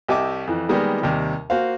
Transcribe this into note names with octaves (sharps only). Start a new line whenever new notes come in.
C2 G4 D#5 E5 A5 D6
F2 E3
D#3 G3 G#3 A#3 B3
D#2 C3 G3
A#3 F#4 C5 F5